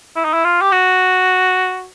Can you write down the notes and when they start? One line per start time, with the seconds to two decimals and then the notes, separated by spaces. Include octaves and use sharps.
0.16 E4
0.25 D#4
0.33 E4
0.44 F4
0.61 G4
0.72 F#4